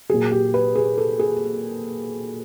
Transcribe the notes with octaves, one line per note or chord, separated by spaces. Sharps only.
A#2 F#3 G#4
G4
B4
G#4
A4
G#4